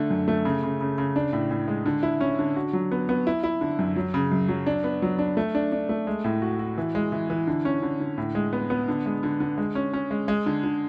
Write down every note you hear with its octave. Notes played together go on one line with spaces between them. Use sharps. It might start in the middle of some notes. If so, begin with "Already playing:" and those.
Already playing: D3 A3
F#2
A3
C#3
C#3
C#3
C#3
D4
A2
A2
G#3
D3
E4
C#4
D3
F#4
F#3
B3
B3
E4
E4
D3
F#2
F#3
C#3
F#2
F#3
D4
B3
F#3
D4
A3
D4
D4
A3
G#3
A2
F#4
F#4
E3
G#3
E3
E3
D3
C#4
D3
D3
A2
G#3
B3
B3
D3
G#3
D3
D3
G#3
C#4
C#4
G#3
G#3
D3
D3